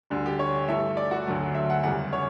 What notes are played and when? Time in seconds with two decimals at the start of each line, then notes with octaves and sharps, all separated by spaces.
0.10 D2 D3 G3
0.26 G4
0.39 C#5
0.68 G2 E3 A3 E5
0.97 D5
1.11 F#4
1.27 D2 D3 F#3 A3
1.54 E5
1.70 F#5
1.83 E2 C#3 G3 F#5
2.13 C#5